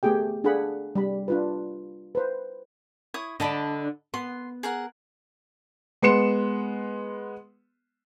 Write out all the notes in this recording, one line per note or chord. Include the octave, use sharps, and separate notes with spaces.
A3 B3 G4 G#4 G5
D4 G#4 A4 F5 F#5 B5
G3 B5
D4 F4 B4
B4 C5
E4 C#5 D#6
D3 D4 D#5 A5 B5
B3 C6
G#4 A#4 F#5
G#3 B3 C6 C#7 E7